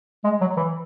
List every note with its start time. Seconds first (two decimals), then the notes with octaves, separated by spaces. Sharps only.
0.24 G#3
0.41 F#3
0.57 E3